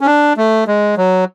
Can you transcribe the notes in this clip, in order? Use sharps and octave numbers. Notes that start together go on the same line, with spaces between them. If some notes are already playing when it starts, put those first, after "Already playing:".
C#4
D4
A3
G#3
F#3